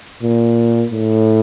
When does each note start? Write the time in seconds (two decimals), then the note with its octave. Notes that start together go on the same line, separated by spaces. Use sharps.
0.22 A#2
0.91 A2